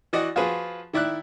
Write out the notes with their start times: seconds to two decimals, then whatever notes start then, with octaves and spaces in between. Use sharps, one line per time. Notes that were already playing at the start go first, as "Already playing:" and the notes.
0.13 E3 F#4 D5 D#5 F#5
0.36 F3 F4 F#4 G#4 B4
0.93 D#3 E4 D5 E5 F#6